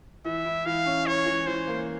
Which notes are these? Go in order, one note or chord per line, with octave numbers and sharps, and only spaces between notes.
E3 E5
E4
E3 F5
C#4
E3 C#5
E3
E3 C5
A#3